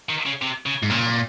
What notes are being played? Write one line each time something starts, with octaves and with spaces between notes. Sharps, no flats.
D#3
C#3
C3
C#3
G#2
A#2 C#3